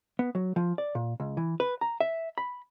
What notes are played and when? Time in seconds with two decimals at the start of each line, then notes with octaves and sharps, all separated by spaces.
0.19 B3
0.35 F#3
0.56 F3
0.78 D5
0.95 A#2
1.20 C#2
1.37 E3
1.60 B4
1.81 A#5
2.00 E5
2.38 B5